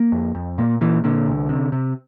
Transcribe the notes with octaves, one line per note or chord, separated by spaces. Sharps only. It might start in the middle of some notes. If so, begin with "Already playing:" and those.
Already playing: A#3
F2
F2
A#2 A#3
A#2 E3
A#2 D3
C2
C3
C3